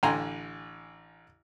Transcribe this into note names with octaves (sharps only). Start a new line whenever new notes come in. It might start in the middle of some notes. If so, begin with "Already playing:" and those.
A1 D3 G5 G#5 A#5 C6